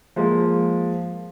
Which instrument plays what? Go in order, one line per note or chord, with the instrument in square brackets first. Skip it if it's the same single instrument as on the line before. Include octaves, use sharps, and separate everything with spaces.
[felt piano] F3 G#3 A#3